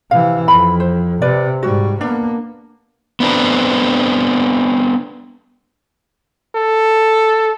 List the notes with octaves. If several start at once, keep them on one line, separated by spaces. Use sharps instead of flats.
C3 E3 F5
F2 B5
C5
C3 B4 D5
G#2 G3 F#4
A#3 B3 D4
B3 C4 D4 B4
A4